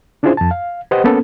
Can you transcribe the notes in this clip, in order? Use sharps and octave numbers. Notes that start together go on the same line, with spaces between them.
C#4 D4 E4 F4 G#4 C5
F2 A5
F5
G4 B4 C5 D#5 F#5
A#3 B3 C#4 A4